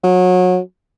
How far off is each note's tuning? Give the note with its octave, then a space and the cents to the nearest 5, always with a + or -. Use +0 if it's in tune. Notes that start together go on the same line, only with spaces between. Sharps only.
F#3 -25